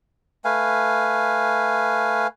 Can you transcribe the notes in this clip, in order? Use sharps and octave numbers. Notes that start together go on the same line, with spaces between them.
A3 B4 F5 G#5